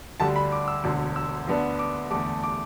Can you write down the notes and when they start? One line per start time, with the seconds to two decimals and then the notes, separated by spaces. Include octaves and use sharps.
0.20 D2 D3 G3 D4 A5
0.36 B5
0.52 D6
0.68 E6
0.84 E1 D2 D3
1.16 E6
1.47 D2 D3 B3 D4
1.79 D6
2.10 E2 D3 A3 D6
2.43 D6